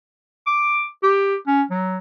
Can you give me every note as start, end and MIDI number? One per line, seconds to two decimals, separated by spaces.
0.47 0.85 86
1.03 1.35 67
1.47 1.62 61
1.71 1.98 54